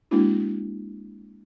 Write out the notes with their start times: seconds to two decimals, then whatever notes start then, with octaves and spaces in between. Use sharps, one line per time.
0.11 G#3 A#3 C4 D4 E4 F#4